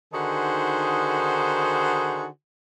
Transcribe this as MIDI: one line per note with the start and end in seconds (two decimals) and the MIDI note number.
0.13 2.27 50
0.13 2.27 51
0.13 2.27 63
0.13 2.27 66
0.13 2.27 68
0.13 2.27 72